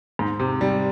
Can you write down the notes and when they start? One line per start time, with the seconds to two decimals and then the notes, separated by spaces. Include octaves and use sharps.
0.19 G#2
0.40 C3
0.61 G3